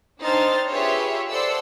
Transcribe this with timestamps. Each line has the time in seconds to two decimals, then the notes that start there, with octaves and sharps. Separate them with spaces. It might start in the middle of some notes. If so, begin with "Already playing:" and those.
0.21 C4 D4 D#4 C5 F6 A6
0.69 F4 G4 G#4 B4 C#5 E5
1.31 A4 C5 D5 F#5 C6 E6